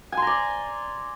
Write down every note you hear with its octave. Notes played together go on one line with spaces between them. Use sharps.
D5 G#5 A#5 C6